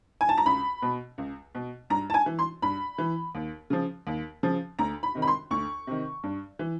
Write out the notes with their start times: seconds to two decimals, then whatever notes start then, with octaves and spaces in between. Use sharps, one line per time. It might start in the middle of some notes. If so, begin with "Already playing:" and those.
0.21 G#5
0.29 A5
0.38 A#5
0.46 C#2 B5
0.82 B2
1.18 C#2
1.55 B2
1.90 G2 A#5
2.10 A5
2.14 G#5
2.26 E3
2.39 C6
2.62 G2 B5
2.98 E3
3.35 D#2
3.70 C#3 F3
4.07 D#2
4.43 C#3 F3
4.79 D2 A#5
5.03 B5
5.15 C3 D#3
5.22 B5
5.28 C6
5.51 D2 C#6
5.87 C3 D#3
6.23 G2
6.59 E3